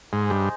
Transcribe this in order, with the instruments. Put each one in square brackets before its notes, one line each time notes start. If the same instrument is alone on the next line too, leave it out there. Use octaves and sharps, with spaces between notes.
[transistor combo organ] G#2 [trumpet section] D#4 G#4 C5
[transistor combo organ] G2